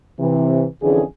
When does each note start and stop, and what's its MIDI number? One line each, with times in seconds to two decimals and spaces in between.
0.19 0.65 48
0.19 0.65 52
0.83 1.03 41
0.83 1.03 50
0.83 1.03 52
0.83 1.03 61
0.83 1.03 68